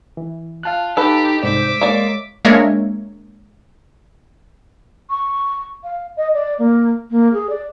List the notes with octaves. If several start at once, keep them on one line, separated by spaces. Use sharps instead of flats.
E3
F4 F5 A5 F#6
D#4 G4 A4 B4
C2 G#2 C5 D5 E5 D6
G#3 A#3 C#5 D5
G#3 A#3 D4 A#4 C#5 E5
C#6
F5
D#5
D5
A#3
A#3
G#4
D5